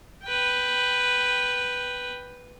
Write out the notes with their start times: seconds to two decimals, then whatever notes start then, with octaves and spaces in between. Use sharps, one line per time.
0.24 B4 G5